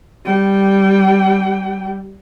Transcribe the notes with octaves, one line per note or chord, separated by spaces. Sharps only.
G3 G5